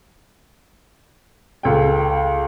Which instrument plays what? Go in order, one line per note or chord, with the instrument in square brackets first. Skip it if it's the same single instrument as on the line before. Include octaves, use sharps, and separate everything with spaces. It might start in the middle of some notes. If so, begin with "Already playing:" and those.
[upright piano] C#2 A4 G5